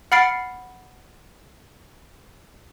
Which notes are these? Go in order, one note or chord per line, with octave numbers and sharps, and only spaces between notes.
F#5 B5 F6 A6 C7 D7